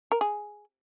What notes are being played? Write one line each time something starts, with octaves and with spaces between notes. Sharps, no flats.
A#4
G#4